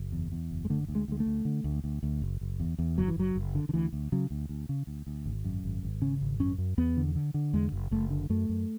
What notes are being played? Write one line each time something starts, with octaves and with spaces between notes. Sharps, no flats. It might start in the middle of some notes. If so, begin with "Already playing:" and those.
Already playing: F#1
E2
E2
F#1
G#3
D3 A3
D2
G#3
D2 G#3
A3
D2
D3
D2
D2
D2
F#1
F#1
E2
E2
F#1 F#3
E3
F#1 F#3
F#1
D3
D3
D2 E3
D2
C#3 F#3
D2
D2
C#3
D2
D2
G#1
F#2
G#1
G#1
C#3 C#4
G#1
F#2 C#4
F#2
E2 B3
D3
D3
D3
E2 G#3
F#1
F#1 A3
D3
F#2 A3
F#2